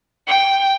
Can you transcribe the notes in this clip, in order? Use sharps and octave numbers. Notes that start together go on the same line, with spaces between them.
G5